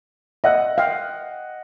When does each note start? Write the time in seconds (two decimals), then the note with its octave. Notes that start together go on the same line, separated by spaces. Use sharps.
0.44 D#5 E5 F#5 F#6
0.78 F5 G5